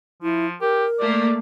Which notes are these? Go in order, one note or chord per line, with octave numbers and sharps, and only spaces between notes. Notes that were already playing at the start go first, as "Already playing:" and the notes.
F3 E4
G4 A#4
A3 A#3 D5